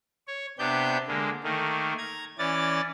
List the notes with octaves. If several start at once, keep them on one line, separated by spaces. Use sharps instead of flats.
C#5
C3 B3 D4 G4 G6
D3 G#3 A#3
D#3 A3 A#3
A#5 G#6
E3 C#4 D5 A6